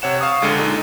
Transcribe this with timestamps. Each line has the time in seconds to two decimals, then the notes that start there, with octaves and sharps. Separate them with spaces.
0.02 C3 C#5 F#5 E7
0.21 F5 C#6 D#6
0.42 C#2 D3 G#3 A4 C#7 D#7
0.59 A#2 G#3 D#4 A4